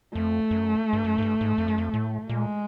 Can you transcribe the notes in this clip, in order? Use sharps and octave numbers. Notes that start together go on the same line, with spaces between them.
F2 A3
F#2
G2
F#2
G#2
G2
G#2
F2
F#2
F2
A2
A#2 G#3